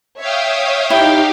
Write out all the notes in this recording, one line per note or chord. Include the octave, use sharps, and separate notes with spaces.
C#5 E5 F5 G5 D#6
D#4 E4 G4 F5 G5